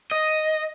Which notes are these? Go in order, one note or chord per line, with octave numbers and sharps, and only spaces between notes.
D#5